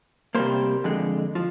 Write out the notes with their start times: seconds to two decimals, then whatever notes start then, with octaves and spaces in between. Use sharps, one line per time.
0.35 C3 G3 A#3 C5
0.84 F2 D3 G#3
1.35 F3